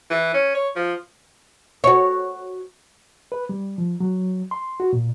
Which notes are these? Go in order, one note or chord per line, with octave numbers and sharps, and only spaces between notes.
E3
C#4
C#5
F3
F#4 C#5
B4
G3
F3
F#3
C6
F#4
A#2